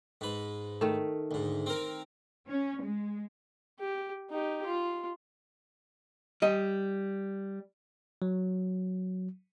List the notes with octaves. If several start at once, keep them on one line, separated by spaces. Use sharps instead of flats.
G#2 B4
D#3 A3
D2 G#2
C4 A#4
C#4
G#3
G4
D#4 G4
F4
G3 D#5
F#3